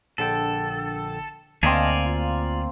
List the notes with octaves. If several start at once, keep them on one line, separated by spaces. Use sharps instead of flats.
A#1 D3 A4 G5
D2 A#3 C4 D5 D#5 F5 G#5 A5
F4